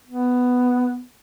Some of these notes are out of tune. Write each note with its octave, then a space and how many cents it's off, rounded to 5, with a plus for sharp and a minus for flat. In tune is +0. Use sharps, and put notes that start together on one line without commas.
B3 +5